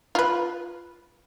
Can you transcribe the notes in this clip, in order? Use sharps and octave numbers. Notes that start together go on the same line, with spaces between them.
F4 B4